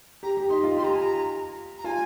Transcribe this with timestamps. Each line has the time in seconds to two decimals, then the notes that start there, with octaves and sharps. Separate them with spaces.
0.23 G4 A#5
0.37 G4
0.49 D#4 C6
0.64 F4
0.76 G4 C6
0.84 A#5
0.93 G#5
1.00 A#5
1.78 A#5
1.84 F4 G#5